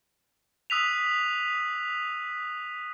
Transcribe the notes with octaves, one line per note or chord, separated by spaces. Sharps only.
D#6 E6 F#6 B6 D#7 F7